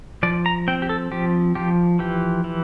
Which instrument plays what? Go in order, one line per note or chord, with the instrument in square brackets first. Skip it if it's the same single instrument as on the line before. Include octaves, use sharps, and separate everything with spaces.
[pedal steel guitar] F3 D5
A#5
C4 G5
G4
A4
F3 G4
F3 G4
E3 G4
E3